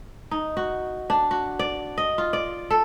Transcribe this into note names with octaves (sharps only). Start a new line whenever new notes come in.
D#4
F#4
D4
F#4
D5
D#5
F4
D5
A4